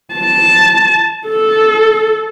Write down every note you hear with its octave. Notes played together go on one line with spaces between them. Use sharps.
A5
A4